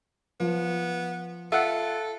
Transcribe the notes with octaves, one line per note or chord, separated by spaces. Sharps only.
F3 B3
F4 A4 E5 F#5